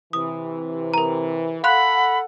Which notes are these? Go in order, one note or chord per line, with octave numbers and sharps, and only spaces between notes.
C3 E3 D#6
A#4 A#5
A4 F5 F#5 B5 C6 F#6